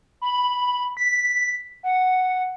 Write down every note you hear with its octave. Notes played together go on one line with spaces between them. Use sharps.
B5
B6
F#5